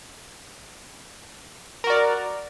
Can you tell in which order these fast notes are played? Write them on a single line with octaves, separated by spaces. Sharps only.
A#4 F#4 D5